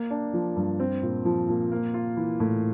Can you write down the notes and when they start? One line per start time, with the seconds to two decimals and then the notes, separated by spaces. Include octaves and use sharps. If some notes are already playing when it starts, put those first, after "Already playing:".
Already playing: A#3
0.11 D4
0.33 F3
0.56 G2
0.80 C4
1.03 A#2
1.25 F3
1.49 A#2
1.72 A#3
1.94 F4
2.17 E3
2.40 A2